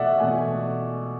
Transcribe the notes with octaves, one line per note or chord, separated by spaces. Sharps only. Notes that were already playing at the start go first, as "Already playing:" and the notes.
Already playing: B2 A3 D5 E5 F#5
B2 A3 G#5